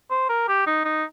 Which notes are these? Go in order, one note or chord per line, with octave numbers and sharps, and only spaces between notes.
C5
A#4
G4
D#4
D#4